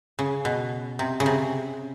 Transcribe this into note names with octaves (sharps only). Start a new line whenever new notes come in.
C#3
B2
C3
C#3
C3